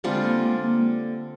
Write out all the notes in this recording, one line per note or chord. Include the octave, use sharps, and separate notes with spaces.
D3 G3 G#3 C4 F4
A#3
G#3
A#3